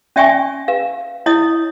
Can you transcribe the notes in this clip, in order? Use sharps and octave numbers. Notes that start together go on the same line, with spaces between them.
C#4 D5 E5 G5 G#5 C#6
B4 F5
E4 C#5 D#5 D#6